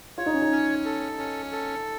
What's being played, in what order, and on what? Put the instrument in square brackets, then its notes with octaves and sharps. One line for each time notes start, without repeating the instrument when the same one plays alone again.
[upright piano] F4 [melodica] C#5
[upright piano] D#4
C#4
D#4
[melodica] C#4
A4
C#4
A4